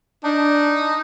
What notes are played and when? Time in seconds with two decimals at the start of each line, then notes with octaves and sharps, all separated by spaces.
0.24 D4 D#4